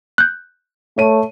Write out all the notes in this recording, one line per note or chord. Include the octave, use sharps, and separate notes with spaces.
F#6 G6
A3 C#5 D#7